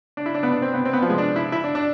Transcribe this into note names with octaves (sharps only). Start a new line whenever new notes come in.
D4
E4
D4
B3
D4
C4
B3
C4
B3
F3
G#3
D4
E4
E4
D4
D4